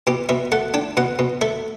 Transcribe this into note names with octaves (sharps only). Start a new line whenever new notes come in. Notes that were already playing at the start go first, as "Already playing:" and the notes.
B2 G4
B2 E5
A3 F#5
D4 G5
B2 F#5
B2
A3 E5